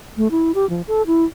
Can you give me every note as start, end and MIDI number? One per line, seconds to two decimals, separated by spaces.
0.17 0.28 57
0.31 0.52 64
0.55 0.68 67
0.70 0.82 53
0.87 1.02 69
1.07 1.25 64